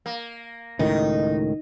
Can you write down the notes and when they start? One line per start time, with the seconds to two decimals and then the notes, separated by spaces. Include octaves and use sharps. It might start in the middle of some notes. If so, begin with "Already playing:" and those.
0.06 A#3
0.79 C#2 A2 D#3 D#4